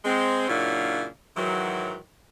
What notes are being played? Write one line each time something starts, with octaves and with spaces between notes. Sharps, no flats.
G#3 C4
A#2 C#3 F#3 A#3 D4 E4
G#2 D#3 E3 F#3